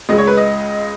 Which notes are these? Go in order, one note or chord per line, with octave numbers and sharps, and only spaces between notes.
C#2 C#3 G#3 D#5
C#5
B4
D#5